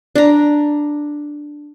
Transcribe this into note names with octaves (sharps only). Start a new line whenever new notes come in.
D4 A#5